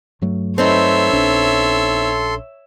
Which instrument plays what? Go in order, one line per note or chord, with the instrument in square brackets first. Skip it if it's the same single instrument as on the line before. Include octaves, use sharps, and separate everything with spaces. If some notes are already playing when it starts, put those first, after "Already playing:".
[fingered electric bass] G2 F#3 A3
[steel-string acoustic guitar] C4 D#4 B4 [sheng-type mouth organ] A4 C6 [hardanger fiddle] C#5 E5
[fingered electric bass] A#1 C#4 D4